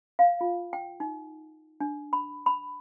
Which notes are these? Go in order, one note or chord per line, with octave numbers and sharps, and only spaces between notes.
F5
F4
G5
D#4
D4
B5
B5